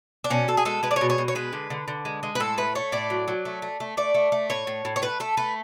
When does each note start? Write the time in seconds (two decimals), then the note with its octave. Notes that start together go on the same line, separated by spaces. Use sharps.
0.24 D4
0.30 B2 C#4
0.48 B2 A4
0.57 G#4
0.65 G#3 A4
0.83 G#3 B4
0.91 D5
0.96 C#5
1.01 B2
1.10 C#5
1.18 B2
1.28 C#5
1.35 G#3 B4
1.53 D3
1.70 D3
1.88 D3
2.05 G#3
2.23 G#3
2.35 B4
2.40 A2 A4
2.58 A3 B4
2.75 A3 C#5
2.92 A2 D5
3.10 F#3
3.28 F#3
3.45 A3
3.62 A3
3.80 A3
3.97 A3 D5
4.14 A3
4.32 A3
4.50 A2 C#5
4.67 A2
4.85 A2
4.96 C#5
5.02 A3 B4
5.20 A3 A4
5.37 A3 B4